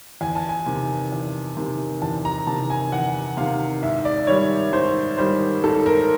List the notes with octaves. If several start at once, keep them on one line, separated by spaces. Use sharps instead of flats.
E2 G#5
A5
G#5
C3 D#3
E2
C3 D#3
E2 A5
A#5
C3 D#3 A5
G#5
E2 F#5
C3 D#3 F5
G#2 E5
D5
D#3 G3 C#5
G#2 C5
D#3 G3 C5
G#2 A4
A#4